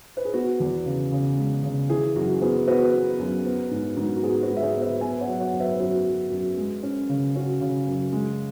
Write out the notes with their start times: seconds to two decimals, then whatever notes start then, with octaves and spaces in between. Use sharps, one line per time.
0.17 B4
0.25 G#4
0.34 B3 F#4
0.60 E2
0.86 C#3
1.12 C#3
1.38 G#3
1.63 C#3
1.89 E3 G#4
2.16 F#2 F#4
2.41 B3 G#4
2.67 B3 F#4 B4
2.94 B3
3.19 F#2
3.45 B3
3.71 G#2
3.97 G#2
4.16 F#4
4.23 B3 G#4
4.42 F#4 B4
4.49 G#2
4.56 E5
4.62 G#4 C#5
4.75 B3
4.82 B4 E5
5.01 B3 E5 G#5
5.21 C#5 F#5
5.27 F#3
5.40 C#5 F#5
5.53 F#2
5.60 B4 E5
5.79 F#2 F#4 B4
6.05 F#3
6.31 F#2
6.57 G#3
6.83 C#4
7.09 C#3
7.35 C#4 F#4
7.61 C#3
7.87 F#2
8.13 G#3